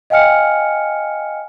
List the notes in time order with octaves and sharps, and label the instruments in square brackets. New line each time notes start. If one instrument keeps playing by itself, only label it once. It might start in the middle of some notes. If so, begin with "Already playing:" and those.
[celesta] D#5 F5 G5 G#5 F6 C#7